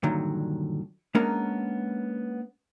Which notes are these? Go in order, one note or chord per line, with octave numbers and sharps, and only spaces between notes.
G2 A#2 D3 D#3 F#3
G#3 A#3 B3 C#4 D4 A#4